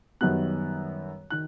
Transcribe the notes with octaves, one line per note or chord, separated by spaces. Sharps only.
F#2 D#3 G3 B3 F#6
D#3 F#6